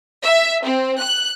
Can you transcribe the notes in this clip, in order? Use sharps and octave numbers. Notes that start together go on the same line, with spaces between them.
E5
C4
F#6